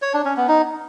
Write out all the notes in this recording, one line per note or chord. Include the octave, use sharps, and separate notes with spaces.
C#5
D4
C#4
B3
D#4